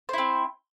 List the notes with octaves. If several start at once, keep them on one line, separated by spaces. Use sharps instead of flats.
C4 E4 C5